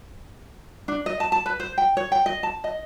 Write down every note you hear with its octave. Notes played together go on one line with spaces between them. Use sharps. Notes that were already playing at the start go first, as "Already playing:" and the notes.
D4
D#5
A5
A5
B4
C5
G5
C#5
G5
D#5
A5
D#5